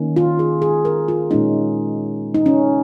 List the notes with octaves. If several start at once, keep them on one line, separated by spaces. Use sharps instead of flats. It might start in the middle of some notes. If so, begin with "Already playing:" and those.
Already playing: D#3 A#3 C#4
F4
G#4
G#4
A#4
F4
A#2 G#3 C#4 D#4
D#4
C#4